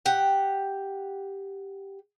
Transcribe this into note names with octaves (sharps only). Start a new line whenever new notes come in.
G4 F#5